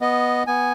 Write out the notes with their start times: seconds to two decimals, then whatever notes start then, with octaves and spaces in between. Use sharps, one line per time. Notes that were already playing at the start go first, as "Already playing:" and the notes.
0.01 B3 D#5
0.47 B3 G#5